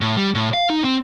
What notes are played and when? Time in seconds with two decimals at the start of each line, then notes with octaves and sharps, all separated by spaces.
0.01 A2
0.17 G3
0.35 A2
0.54 F5
0.70 D#4
0.84 C4